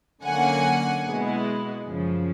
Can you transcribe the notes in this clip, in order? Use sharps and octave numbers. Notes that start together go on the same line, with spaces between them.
D3 F#3 A#3 C#4 F#5 G#5
B2 G#3 B3 E4
F#2 C#3 F3